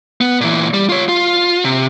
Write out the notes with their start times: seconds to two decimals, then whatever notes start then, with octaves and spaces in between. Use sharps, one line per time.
0.21 B3
0.41 A#2 E3
0.74 G3
0.89 F4 C#5
1.09 F4
1.64 C3